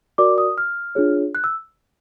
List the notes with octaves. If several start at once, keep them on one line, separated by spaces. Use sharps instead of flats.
F#4 A#4 D5 D6
D#6
F6
D4 F4 G#4 C#5
F#6
E6